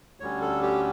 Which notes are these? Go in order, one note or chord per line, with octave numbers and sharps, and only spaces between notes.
D2 D3 G3 C#4 C#5
A4
G4